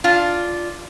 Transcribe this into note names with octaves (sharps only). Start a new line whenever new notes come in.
D4 F4